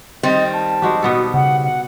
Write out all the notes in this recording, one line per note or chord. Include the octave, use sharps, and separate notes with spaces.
D#3 G3 C4 D#5
A5
G#3 F#4 G4
B2 B3 A4
C#3 F#5
F#5